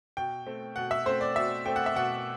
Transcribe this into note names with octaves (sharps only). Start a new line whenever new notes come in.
B2 G5
A3 C4
B2 F#5
E5
A3 C4 C5
D5
B2 E5
A3 C4 G5
F#5
E5
B2 F#5